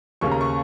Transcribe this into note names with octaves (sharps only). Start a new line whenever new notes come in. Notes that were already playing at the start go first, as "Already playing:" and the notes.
D#2 C#3 A#3 C#4 C#6
A#5
C#6